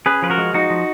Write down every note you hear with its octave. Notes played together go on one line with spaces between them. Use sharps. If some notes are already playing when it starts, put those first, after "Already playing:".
C#4 G#4 B4
F3 B4
F#4 A#4
G#3
F3 D#4 F#4
F3